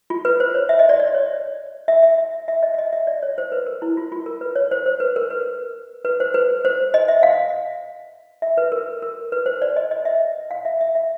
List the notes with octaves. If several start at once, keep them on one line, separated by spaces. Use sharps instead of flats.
F4
B4
C5
C#5
E5
D#5
D5
D5
C#5
E5
E5
E5
E5
D#5
E5
D#5
E5
D5
C#5
C5
B4
A#4
E4
F4
F4
A#4
B4
C#5
C5
C5
B4
A#4
B4
B4
C5
B4
C5
D#5
E5
F5
E5
B4
A#4
A#4
B4
C5
D5
D#5
D#5
E5
F5
E5
E5
E5